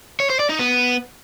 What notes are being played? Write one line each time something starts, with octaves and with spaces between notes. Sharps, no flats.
C#5
C5
D5
D#4
B3